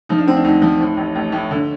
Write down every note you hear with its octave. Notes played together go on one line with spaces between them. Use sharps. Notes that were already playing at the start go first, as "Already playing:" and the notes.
F3 D#4
D4
D2 C4
D4
D2 D#4
F3
A2
A1
A1
A2
D3